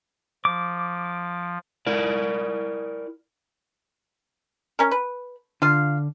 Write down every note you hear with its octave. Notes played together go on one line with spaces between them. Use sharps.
F3 D6
E4 A#4 D5
C#4 A#4
B4
D3 F4 F5